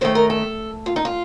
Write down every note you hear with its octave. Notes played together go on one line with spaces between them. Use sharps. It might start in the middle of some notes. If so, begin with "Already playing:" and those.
F#2 D#3 A3 C5
A#4
A4
F4
D#4
F4